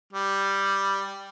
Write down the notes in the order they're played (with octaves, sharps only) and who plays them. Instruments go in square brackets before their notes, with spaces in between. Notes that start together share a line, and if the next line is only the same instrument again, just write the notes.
[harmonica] G3